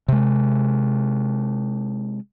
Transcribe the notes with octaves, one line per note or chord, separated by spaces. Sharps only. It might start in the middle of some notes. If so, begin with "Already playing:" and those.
C3 G#3